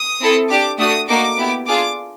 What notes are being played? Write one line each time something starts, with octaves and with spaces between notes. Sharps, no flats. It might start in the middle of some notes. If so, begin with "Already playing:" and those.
Already playing: D#6
C4 E4 A4
D4 G4 D6
A3 D4 F#4 D#6
A#3 D#4 F#4 A4 D6
B3 E4 G4
D4 F4 G#4 D6